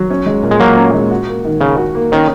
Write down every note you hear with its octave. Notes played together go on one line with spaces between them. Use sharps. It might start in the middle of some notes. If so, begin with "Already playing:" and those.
Already playing: F#3
C#4
G#3
A#2
G#3
A#2 F#3 A#3
C#4
G#3
F#4
A#3
D#3
C#3 A#4
F#4
A#3
D#3 C#4